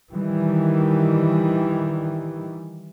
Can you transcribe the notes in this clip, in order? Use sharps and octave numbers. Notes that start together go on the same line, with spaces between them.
D#3 E3 G3